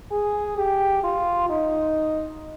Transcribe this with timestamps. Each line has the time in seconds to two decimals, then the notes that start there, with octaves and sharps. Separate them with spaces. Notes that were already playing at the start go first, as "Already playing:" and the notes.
0.11 G#4
0.57 G4
1.04 F4
1.50 D#4